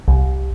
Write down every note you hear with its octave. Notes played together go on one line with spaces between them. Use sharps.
C2